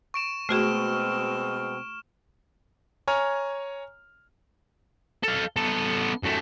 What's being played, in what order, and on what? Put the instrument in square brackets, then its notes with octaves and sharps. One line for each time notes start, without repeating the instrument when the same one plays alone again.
[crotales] C#6 D7 E7
[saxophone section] B2 G#3 C4 [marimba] A3 F#4 G#4 [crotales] F6 E7
[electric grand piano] C#5 G#5 A#5 F6
[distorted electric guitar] A4 F5
B3 A4
F#2 A3